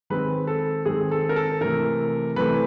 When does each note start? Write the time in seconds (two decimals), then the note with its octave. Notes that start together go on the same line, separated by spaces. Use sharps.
0.10 D#3 G#3 C4 B4
0.47 A4
0.86 D#3 G#3 C4 G#4
1.11 A4
1.29 A#4
1.36 A4
1.61 C3 E3 A3 A#4
2.36 C3 E3 A3 B4